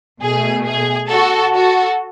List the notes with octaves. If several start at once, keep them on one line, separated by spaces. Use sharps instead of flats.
B2 A3 G#4
G#4
F#4 A4
F#4 A4